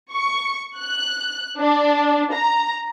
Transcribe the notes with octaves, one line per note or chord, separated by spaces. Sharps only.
C#6
F#6
D4
A#5